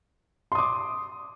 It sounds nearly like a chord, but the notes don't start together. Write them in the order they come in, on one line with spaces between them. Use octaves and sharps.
C6 D#6 D6